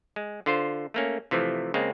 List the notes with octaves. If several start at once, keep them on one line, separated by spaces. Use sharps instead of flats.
G#3
D3 F4 C5
A3 A#3 C#4
C3 E3 F3 A3
C#3 G#3 A#3 C4